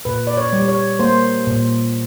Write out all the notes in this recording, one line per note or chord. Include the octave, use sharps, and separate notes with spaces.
A#2 B4
D5
C#5
G3
C#5
A#3 C5
A#2